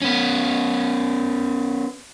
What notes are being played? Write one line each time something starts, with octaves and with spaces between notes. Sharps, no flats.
B3 C#4